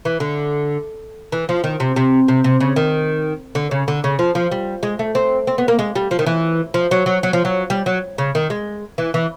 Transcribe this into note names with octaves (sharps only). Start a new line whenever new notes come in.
E3
D3
E3
F3
D#3
C3
C3
C3
C3
C#3
D#3
D3
C#3
D3
C#3
F3
F3
G3
G#3
A3
C4
C4
B3
A#3
G#3
G3
F3
D#3
E3
F3
F#3
F#3
F#3
F3
F#3
G3
F#3
C#3
D#3
G#3
E3
E3